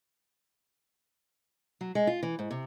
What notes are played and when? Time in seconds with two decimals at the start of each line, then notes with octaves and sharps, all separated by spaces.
1.81 F#3
1.95 G#3
2.07 F4
2.23 E3
2.39 G#2
2.51 C3